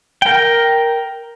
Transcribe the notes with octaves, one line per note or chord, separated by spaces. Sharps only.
A#4 G5